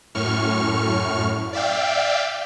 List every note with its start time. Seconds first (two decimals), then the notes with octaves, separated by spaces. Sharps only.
0.15 F#2 A2 C#6 F6
1.53 D5 E5 F5 G5